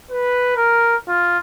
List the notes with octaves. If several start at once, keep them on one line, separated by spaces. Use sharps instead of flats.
B4
A#4
F4